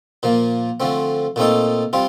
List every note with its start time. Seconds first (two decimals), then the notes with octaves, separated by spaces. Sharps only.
0.23 A#2 F3 A#3
0.80 D3 F3 A3 C4
1.36 A#2 A3 C4 D#4 A4
1.93 G3 C4 F4